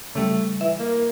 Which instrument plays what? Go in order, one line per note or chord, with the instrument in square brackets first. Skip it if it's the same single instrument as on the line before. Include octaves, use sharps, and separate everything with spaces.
[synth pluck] C#3 G3 [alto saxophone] A3
[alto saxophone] E3 [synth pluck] E5
[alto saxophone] A#3